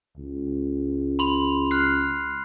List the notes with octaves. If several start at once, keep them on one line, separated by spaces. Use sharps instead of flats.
C#2
B5 C6 F7
F6 F#6 C7